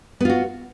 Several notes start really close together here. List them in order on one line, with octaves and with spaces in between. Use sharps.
B3 F4 F#4